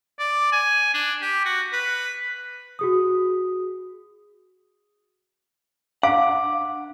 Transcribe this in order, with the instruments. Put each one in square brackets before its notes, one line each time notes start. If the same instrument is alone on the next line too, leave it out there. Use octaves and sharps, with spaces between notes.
[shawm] D5
G#5
D4
G4
F#4
B4
[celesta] F#4 G#4 D#6
[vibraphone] D4 [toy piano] F5 [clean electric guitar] F#5 [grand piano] D6